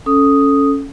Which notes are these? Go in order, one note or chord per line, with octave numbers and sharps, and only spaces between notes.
C#4 A4 D#6